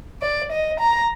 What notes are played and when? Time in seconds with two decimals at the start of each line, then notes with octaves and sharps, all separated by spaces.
0.22 D5
0.51 D#5
0.80 A#5